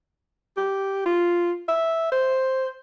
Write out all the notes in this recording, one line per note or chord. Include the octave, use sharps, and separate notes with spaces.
G4
F4
E5
C5